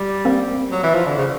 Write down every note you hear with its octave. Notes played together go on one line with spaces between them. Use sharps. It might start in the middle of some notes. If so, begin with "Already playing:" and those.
Already playing: G3
A#3 C4
F#3
E3
F3
D3
C#3